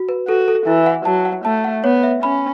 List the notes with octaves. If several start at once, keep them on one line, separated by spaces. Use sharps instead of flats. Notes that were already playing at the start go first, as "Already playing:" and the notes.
Already playing: F#4
B4
F#4 A4
A4
E3 E4
F#5
F#3 A5
F#5
A3 A5
F#5
B3 C#5
E5
C#4 B5